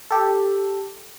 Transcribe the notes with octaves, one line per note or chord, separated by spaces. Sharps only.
G4 A4